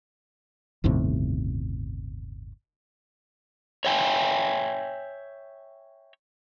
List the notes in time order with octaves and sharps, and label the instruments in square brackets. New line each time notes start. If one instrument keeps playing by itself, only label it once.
[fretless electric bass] G1 D#2 A2 C3
[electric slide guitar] C#5 E5 G5 G#5